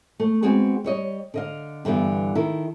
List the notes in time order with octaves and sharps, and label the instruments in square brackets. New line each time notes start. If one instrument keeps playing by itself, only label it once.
[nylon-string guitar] A3
G#3 B3 C4 F#4 G#4
G3 C#5 D#5
D3 D#5 F5
G2 D3 E3 B3
D#3 E4 A4